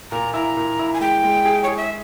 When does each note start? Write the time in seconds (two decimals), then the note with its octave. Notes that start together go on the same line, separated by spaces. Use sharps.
0.11 A#2 A#5
0.34 E4 A#5
0.57 A#2
0.79 E4
0.94 G#5
1.00 G#3 G5
1.23 G#3
1.45 G#4
1.64 G#4 C#5
1.77 E5